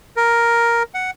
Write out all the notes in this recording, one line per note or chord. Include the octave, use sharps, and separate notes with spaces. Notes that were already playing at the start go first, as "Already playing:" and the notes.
A#4
F#5